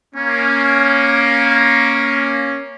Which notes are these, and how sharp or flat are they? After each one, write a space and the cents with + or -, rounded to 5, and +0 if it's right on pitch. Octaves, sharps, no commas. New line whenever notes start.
A#3 +10 C#4 +0